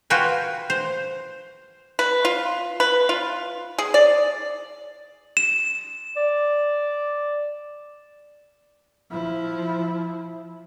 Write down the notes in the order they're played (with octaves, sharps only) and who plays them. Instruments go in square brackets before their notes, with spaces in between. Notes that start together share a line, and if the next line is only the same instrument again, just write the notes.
[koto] F4 F#4 B4 G5 G#5
C5
[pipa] B4
F4
B4
F4
G#4
D5
[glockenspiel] E7
[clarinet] D5
[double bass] F3 E4